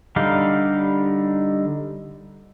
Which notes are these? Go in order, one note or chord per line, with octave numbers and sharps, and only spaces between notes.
D3 G3 D#4 F5